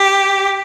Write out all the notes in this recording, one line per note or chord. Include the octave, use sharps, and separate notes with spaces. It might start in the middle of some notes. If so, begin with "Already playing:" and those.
Already playing: G4